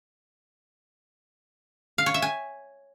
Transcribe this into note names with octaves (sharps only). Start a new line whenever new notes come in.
F5
C#5
E5
G#5